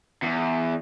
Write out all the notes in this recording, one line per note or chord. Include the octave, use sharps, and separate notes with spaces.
E2